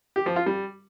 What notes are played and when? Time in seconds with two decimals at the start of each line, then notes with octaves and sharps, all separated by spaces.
0.16 G4
0.26 F3
0.36 F4
0.46 G3